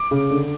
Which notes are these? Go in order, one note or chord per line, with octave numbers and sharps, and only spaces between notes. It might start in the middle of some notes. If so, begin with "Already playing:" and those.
Already playing: D6
C#3
D3